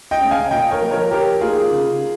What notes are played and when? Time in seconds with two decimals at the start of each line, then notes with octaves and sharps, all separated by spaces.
0.11 D#5 G5
0.21 G#3 C#4
0.31 F5 G#5
0.51 A#2 D#5 G5
0.71 A#4 C#5
0.81 F3 A#3
0.91 A#4 C#5
1.11 F3 G4 A#4
1.41 A#3 D#4 F4 G#4
1.71 C#3